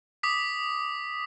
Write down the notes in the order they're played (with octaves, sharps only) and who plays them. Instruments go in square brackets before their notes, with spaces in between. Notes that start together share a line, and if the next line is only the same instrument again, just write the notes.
[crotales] D6 D#6 B6